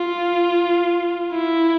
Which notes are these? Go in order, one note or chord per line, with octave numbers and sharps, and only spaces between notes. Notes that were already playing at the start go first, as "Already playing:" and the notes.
Already playing: F4
E4